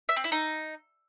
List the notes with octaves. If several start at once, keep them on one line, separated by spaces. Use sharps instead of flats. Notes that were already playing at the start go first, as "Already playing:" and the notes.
E5
C4
E4
D#4